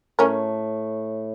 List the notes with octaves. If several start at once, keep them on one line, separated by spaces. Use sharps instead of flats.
A2 C#4 A#4